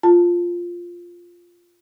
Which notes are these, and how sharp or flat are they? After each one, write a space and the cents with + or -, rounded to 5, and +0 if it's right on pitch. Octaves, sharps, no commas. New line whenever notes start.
F4 +0 A5 +10